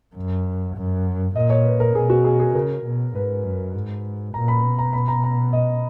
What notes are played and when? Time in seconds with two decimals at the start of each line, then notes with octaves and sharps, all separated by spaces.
0.16 F#2
0.76 F#2
1.35 A#2 D#5
1.50 C#5
1.65 B4
1.80 A#4
1.95 B2 G#4
2.10 F#4
2.25 G#4
2.40 G#4
2.55 C#3 A#4
2.84 B2
3.15 G#2 B4
3.44 F#2
3.74 G#2
4.34 A#2 A#5
4.48 B5
4.64 B2
4.79 A#5
4.93 B5
5.08 A#5
5.24 A#5
5.53 D#5